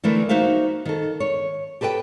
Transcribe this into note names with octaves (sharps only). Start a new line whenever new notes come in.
D3 E3 A3 E4 A#4
A#3 D#4 F#4 C5 E5 F5
D#3 A4
C#5
G4 A4 B4 C5 G5